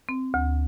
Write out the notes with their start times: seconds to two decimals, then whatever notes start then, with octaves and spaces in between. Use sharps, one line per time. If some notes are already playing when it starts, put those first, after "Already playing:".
0.09 C4
0.34 D2